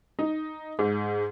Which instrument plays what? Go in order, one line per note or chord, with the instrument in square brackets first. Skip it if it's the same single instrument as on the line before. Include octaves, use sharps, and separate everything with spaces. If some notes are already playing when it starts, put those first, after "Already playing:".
[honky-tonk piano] D#4
G#2